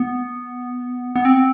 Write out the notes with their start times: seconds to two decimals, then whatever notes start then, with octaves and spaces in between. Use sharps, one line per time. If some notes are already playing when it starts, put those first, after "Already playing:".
Already playing: B3
1.16 B3
1.25 C4